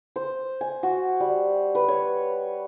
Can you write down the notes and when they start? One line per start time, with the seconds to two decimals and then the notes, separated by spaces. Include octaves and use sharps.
0.16 C5
0.61 G#5
0.83 F#4
1.20 G3
1.75 B4
1.88 C#5